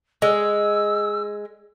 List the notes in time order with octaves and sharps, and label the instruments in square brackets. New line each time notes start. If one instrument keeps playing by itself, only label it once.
[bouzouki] G#3 [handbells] D#5 [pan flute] E6